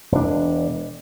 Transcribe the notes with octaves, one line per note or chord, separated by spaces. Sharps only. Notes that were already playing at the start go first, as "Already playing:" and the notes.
E1 D4